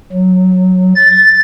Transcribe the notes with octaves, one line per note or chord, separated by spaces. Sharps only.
F#3
A6